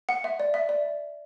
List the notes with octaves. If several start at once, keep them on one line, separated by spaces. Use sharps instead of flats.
F#5
E5
D5
E5
D5